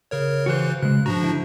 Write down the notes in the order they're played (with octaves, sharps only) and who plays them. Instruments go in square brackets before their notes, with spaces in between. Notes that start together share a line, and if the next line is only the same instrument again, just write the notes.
[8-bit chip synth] C#3 A#4 C#5
[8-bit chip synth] C#3 E3 F#6 [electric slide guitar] F#4 C5
[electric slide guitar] C#3 G#3 [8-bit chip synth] F#6
[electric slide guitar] G#2 A#5 [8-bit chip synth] F3 D4 F#4
[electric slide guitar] D3 E4